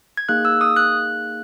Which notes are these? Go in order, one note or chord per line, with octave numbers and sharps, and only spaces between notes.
G#6
A#3 D#4 G#4 F#6
E6
D#6
F#6